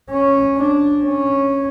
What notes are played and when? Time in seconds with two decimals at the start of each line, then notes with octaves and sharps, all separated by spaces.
0.10 C#4
0.57 D4
1.03 C#4